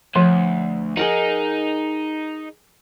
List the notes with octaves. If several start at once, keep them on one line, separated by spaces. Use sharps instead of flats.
D2 F3
D#4 G#4 A#4 F#5